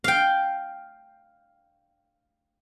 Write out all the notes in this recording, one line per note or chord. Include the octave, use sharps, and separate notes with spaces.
F5 G5